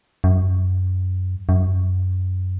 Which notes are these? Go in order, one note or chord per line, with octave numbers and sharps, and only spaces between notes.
F#2
F#2